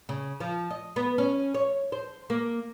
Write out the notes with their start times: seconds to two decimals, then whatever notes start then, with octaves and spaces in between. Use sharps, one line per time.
0.09 C#3
0.40 F3
0.70 D#5
0.96 B3
1.18 C#4
1.54 C#5
1.92 C5
2.30 A#3